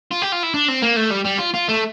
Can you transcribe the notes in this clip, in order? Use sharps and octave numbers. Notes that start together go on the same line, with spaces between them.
F4
G4
F4
E4
D4
C4
A#3
A3
G3
G3
F4
F4
A3